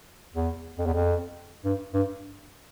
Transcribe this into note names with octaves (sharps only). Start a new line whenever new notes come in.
E2
F2
E2
F2
G2
G2